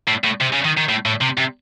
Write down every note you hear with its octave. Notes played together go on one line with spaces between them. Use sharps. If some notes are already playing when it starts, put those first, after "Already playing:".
A2
A2
C3
C#3
D#3
D#3
A2
A2
C3
C3